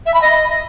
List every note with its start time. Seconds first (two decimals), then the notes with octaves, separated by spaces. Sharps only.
0.06 E5
0.14 B5
0.22 D#5